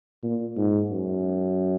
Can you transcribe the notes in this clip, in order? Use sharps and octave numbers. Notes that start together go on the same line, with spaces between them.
A#2
G#2
F#2